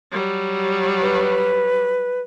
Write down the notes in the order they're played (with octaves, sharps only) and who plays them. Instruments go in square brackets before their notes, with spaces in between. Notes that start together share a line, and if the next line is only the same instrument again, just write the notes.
[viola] F#3 G3
[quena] B4